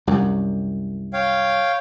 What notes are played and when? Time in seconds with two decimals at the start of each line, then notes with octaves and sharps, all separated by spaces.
0.07 C2 F#2
1.13 C#5 F5 G5